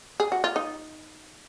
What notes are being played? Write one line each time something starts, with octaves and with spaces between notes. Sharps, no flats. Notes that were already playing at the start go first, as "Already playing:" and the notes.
G#4
F#4
F4
D#4